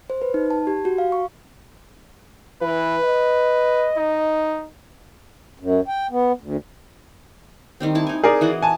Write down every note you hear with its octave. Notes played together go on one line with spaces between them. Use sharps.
C5
B4
D#4
A5
G4
F#4
F5
C#6
E3 B4
D#5
D#4
F#2
G5
B3
D2
D#3 G3 C4
E4 A5
D#4 G#5
G#4 A#4 D5
E3 F#4 D#5
G#5 A5